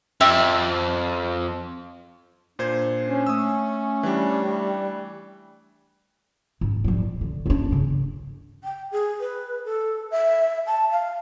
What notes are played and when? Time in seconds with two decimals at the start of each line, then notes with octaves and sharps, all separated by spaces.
0.21 F2 G4 E5
2.59 A#2 D4 C5 G#6
3.07 C#4
3.26 A3 D#6 E6
4.03 E3 G3 D4
6.61 G#2
6.84 F3 G3
6.99 A#2
7.21 D3
7.46 F#2 D4
7.71 G2 C#3
8.64 G5
8.92 G#4
9.20 B4
9.65 A4
10.11 E5
10.67 A5
10.91 F5